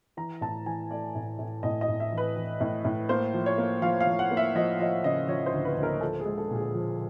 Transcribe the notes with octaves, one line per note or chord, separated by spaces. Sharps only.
E3 A#5
A2 A5
E3 G#5
A3 D5
A2
A2
A2 D#5
D#5
A2
E5
E3
B4
E3
A2
A2
A#3 C5
F3
C#5
A#3
F3 F5
F5
F3
F#5
A#3
E5
F3 D#5
F3 D#5
C#3 D#5
F3 C#5
C5
D2
B4
D2
A#4
F3 A4
G#4
G#3
A4
A#2
G#4
F3